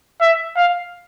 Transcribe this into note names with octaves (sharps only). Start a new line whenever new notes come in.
E5
F5